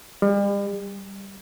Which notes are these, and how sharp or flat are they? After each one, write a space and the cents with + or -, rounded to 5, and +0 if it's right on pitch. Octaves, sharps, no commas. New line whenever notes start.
G3 +40
G3 +0